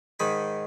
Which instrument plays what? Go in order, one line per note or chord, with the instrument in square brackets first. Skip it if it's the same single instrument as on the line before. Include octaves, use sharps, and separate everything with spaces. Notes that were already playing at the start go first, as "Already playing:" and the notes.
[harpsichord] G#2 D#3 G#3 B5